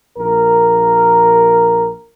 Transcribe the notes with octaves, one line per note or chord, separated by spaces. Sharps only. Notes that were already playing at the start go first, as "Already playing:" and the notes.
A#1 A#3 A#4